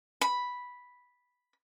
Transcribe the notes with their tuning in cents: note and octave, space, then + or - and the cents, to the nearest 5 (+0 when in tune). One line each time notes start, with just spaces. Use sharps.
B5 -5